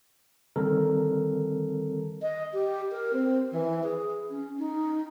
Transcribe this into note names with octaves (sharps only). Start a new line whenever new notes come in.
D3 D#3 G3 C4 A4 A#4
D#5
G4
A#4
C4
E3
G#4
C#4
D#4